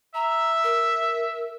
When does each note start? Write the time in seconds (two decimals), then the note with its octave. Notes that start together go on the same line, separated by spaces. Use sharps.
0.15 E5 A#5
0.64 A#4